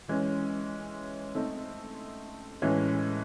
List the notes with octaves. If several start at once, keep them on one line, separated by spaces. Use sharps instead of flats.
E3 G#3 C#4
A3 C4 D#4
A2 E3 G#3 C#4